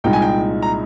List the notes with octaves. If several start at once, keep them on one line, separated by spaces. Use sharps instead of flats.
C2 A#2 G#3 D#4 G5
G#5
G5
A#5